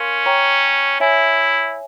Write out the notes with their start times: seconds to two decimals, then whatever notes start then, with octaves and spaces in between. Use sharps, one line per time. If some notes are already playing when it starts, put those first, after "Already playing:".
Already playing: C#4 A#4 F5 C6
0.26 C#5 G5 A#5 C#6
1.00 E4 C#5 E5 G#5